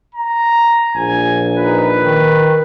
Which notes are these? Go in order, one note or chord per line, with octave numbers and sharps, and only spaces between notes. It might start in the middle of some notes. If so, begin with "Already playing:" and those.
A#5
A#1 G#5
D#4 B4
D#3